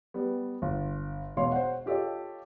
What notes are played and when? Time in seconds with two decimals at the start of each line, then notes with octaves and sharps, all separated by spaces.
0.14 G3 B3
0.62 G1
1.37 E1 B2 C#5 F5 C6
1.52 C5 C#5 F#5
1.86 F4 G4 A4 C#5 D#5